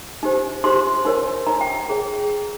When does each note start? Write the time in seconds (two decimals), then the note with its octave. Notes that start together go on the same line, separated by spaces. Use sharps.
0.23 D#4 G4 C5
0.64 D#4 G4 C5 C6
1.05 D#4 A#4 C#5
1.47 D#4 A#4 C#5 A#5
1.61 G5
1.74 G5
1.88 D#4 G#4 C#5